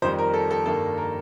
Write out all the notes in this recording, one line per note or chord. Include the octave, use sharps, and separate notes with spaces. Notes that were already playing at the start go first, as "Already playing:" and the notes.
F2 D#3 G3 C5
A#4
A4
A4
G2 D#3 A#3 A4
A#4